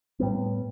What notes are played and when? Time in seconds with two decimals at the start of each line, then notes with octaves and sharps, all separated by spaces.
0.20 A2 G3 B3